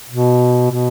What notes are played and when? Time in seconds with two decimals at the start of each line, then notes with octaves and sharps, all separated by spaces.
0.10 B2
0.71 B2